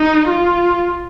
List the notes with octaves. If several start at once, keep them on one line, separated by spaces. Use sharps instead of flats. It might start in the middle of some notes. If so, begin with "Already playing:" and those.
Already playing: D#4
F4